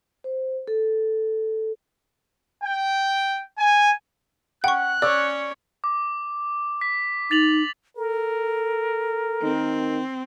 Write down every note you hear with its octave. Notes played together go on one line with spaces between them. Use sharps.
C5
A4
G5
G#5
C#4 F#5 G5 C#6 F#6
C#4 C#5 D5 E6
D6
B6
D#4 A6 F7 F#7
A4 A#4
D#3 C4